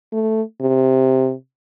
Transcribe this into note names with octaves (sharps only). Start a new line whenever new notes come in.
A3
C3